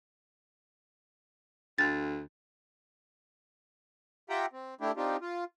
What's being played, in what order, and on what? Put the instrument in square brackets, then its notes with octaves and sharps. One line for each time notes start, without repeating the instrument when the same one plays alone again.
[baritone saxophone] D2 [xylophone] A6
[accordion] F4 G4 E5 F#5 G5 A#5
C4
A3 D4 E4 G4
C4 D4 D#4 F4 G4
F4